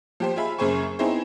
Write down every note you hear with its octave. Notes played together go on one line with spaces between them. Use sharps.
F3 G4 C5
F4 G#4 E5 B5
F#2 C#3 G#4 C5 G#5 C#6
C#6
B3 C4 D#4 E4 G#4 C5